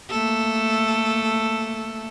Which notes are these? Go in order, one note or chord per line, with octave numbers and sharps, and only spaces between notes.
A3 A#3 A4